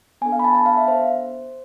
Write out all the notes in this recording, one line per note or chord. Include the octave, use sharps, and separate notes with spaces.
B3 D4 A4 G#5
F5
B5
A5
A5
F5
E5
C5